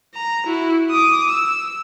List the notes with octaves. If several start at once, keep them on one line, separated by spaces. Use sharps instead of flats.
A#5
E4 F#4
D6 D#6
E6